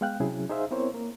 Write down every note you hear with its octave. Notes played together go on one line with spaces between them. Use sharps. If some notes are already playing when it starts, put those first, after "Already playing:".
G#3 B3 F5 G5 F#6
C3 F#3 C#4 E4 G#4
D#4 G#4 C5 E5 F5
B3 C4 E4 A#4 C5 C#5
A#3 A#4